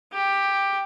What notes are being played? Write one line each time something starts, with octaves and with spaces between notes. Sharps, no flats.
G4